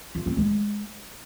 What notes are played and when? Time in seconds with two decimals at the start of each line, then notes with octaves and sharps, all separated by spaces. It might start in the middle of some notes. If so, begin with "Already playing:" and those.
0.15 F4
0.26 C4
0.37 G#3